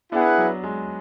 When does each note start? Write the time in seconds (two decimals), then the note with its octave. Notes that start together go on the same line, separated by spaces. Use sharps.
0.12 B3 D4 E4 G#4 B4 F#5
0.38 F#3
0.64 G#3